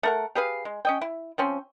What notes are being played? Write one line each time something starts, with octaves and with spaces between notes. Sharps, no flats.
A3 A#4 F#5
G4 G#4 B4 F5
G#3
C#4 D#5 G5
E4
F3 C4 C#4